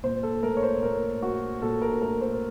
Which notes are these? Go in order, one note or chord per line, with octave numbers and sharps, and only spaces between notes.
A#2 C5
A4
A3 A#4
C#5
C5
A#2 A#4
A3 F#4
A#2 A4
A#4
A3 A#4
C5